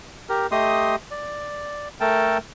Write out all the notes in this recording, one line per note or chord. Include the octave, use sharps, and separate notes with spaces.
G4 A#4
A3 G4 D#5 C6 D#6
D5
A3 A4 A#4 G5 A5